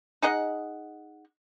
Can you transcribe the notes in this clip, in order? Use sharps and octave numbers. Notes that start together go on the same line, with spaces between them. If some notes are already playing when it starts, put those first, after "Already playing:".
D#4 G#4 D#5 F#5